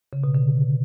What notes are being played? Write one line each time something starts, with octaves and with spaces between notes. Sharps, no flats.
C#3
B2
D3